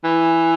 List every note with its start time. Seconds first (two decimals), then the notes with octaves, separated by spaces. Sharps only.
0.04 E3